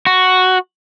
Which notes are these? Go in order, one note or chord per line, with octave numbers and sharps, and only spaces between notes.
F#4